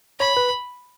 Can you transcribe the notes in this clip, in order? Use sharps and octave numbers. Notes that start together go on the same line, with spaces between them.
C#5 B5
B4